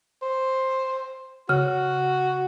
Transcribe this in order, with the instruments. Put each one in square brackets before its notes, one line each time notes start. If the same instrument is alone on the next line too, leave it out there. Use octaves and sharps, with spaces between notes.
[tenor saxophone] C5
[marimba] C#3 F6 [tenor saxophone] F#4